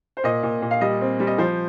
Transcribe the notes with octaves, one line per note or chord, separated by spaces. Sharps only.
C5
A#2 D#5
A#2
A#2
F5
G3 D#5
C4
G3
D#5
F3 C5